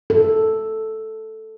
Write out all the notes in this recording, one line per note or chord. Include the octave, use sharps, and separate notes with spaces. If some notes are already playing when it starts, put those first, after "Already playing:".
A4